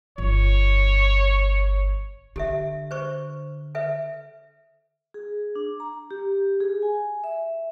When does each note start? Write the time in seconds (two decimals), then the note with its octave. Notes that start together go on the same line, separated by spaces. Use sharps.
0.18 G1 C#5
2.36 D3 G4 A4 E5
2.91 B4 C5 C#6
3.75 A4 B4 E5
5.14 G#4
5.55 D4
5.80 A#5
6.11 G4
6.61 G#4
6.82 G#5
7.24 E5